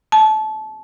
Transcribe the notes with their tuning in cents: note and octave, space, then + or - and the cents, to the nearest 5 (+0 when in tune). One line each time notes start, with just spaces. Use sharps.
A5 -25